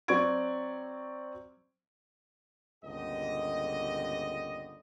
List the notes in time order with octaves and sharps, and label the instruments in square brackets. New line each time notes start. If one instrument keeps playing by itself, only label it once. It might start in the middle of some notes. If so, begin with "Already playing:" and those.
[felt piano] F#3 C4 D5 C#6 G#6 D7
[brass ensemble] G1 C#2 A#2 D3 G4 D#5